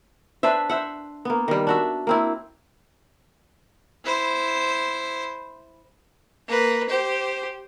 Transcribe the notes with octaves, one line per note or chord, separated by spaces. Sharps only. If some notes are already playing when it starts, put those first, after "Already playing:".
D4 B4 C5 E5
C5 E5 F#5
A#3 B3
D#3 G3
D4 F#4 E5
A#3 C4 E4
E4 C5
A#3 B4
G4 C5